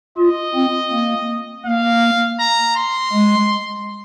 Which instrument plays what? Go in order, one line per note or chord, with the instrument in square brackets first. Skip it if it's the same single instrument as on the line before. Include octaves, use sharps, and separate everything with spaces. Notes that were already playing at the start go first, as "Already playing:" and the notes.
[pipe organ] F4 [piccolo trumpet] D#5
[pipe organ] C4
A#3
[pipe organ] A#3 [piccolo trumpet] F5
[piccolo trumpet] A#5
C6
[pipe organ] G#3